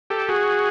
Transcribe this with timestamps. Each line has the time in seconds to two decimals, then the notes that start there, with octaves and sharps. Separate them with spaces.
0.10 G4 A4
0.29 F#4 G#4